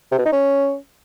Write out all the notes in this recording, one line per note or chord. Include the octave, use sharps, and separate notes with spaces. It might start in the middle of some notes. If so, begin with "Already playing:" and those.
C3
B2
D#4
C#4